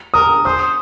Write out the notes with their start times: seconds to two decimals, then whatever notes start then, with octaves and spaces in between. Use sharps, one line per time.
0.14 A#4 D#6
0.45 C5 D#6